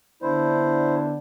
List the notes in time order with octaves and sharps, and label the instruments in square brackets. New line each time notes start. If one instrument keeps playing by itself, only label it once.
[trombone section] D3 B3 D4 [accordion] E4 C5